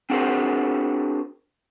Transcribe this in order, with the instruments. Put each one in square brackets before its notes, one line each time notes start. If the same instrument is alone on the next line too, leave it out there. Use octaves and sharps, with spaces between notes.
[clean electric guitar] C4 D4 F#4 G#4 A#4 C5